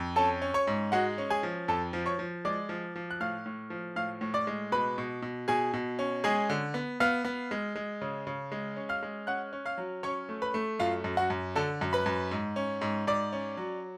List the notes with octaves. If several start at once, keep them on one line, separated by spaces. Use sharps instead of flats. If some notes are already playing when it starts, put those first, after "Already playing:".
Already playing: F2
C#4 A4 A5
C#4
C#5 C#6
G#2
G#3 F#4 F#5
C#4
G#4 G#5
F3
F2 A4 A5
F3
C#5 C#6
F3
G#3 D5 D6
F3
F3
F#6
A2 F5 F6
A2
F3
A2 F5 F6
A2
D5 D6
G#3
B2 B4 B5
B2
B2
B2 G#4 G#5
B2
C#4
G#3 G#4 G#5
D3
B3
B3 F5 F6
B3
G#3
G#3
C#3
C#3
G#3
C#4
F5 F6
G#3
C#4 F#5 F#6
C#4
F5 F6
F#3
C#4 C#5 C#6
A3
B4 B5
A3
F#2 F4 F5
F#2
F#4 F#5
F#2
D3 A4 A5
F#2
B4 B5
F#2
G#2
C#4
G#2
G#2 D5 D6
C#4
F#3